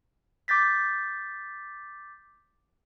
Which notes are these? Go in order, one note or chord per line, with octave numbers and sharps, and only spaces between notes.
D6 G6 A6 B6